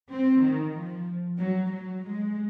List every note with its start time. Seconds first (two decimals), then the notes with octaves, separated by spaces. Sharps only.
0.09 C4
0.42 D#3
0.74 F3
1.38 F#3
1.71 F#3
2.04 G#3